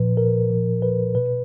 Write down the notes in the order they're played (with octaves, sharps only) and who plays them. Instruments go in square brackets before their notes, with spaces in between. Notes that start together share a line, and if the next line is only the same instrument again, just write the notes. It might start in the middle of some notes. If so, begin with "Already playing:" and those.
Already playing: [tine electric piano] A#2 F3 B4
A#4
A#2 F3
B4
B2 B4